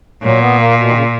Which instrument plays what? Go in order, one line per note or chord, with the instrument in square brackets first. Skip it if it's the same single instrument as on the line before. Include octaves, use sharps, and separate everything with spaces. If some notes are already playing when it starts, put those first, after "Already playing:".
[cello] A#2 [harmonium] F#3
[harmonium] B3
A#3
B2
D#3
C#3